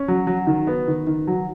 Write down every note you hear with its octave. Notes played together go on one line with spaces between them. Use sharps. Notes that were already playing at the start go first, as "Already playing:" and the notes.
Already playing: C#4
F#3
F#3
D#3
B3
D#3
D#3
F#3